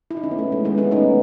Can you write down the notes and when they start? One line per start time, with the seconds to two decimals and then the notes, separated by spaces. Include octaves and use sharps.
0.11 E4
0.17 D#4
0.24 C#4
0.31 B3
0.39 A3
0.52 G#3
0.65 G#3 B3
0.78 A3 C#4
0.91 B3 D#4